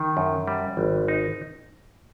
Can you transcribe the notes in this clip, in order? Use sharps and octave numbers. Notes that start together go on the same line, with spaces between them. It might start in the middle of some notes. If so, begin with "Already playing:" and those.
Already playing: D#3
F#2
G3
G#1
D#4